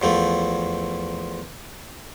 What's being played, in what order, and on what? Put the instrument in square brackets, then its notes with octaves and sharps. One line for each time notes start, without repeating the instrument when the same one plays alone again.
[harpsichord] E2 F3 A3